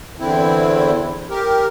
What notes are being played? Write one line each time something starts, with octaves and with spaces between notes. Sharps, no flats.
E2 D3 C4 E4
G4 A#4